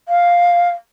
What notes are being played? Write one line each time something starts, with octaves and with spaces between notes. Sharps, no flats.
F5